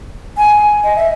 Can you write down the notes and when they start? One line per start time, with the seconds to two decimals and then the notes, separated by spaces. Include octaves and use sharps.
0.38 G#5
0.84 D#5
0.96 E5